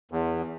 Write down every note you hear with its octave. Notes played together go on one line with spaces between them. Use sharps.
E2